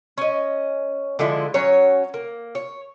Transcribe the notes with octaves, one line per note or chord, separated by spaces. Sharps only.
C#4 D#5
D3 F3 G#3 E4
F#3 C#4 C#5
A#3
C#5